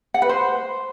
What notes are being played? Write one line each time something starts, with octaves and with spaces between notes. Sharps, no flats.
F#5
B4
C5